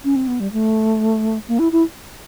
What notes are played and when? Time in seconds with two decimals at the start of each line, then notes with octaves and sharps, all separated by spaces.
0.05 C#4
0.16 C4
0.28 B3
0.40 G3
0.53 A3
1.48 A#3
1.59 E4
1.72 E4